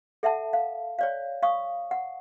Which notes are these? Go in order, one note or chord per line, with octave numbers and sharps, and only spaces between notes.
A4 E5 F#5 A5
F5
C#5 D5 F5
F5 C#6 D#6
F#5